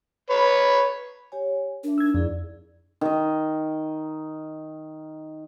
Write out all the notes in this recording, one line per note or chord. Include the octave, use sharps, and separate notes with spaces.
B4 C#5
G4 C#5 G#5
D4 A#4 E5
D#4 E6 G#6
F2 E4 G#4 D5
D#3 D#5